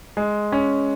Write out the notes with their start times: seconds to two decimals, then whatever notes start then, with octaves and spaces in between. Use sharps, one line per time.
0.17 G#3
0.52 C#4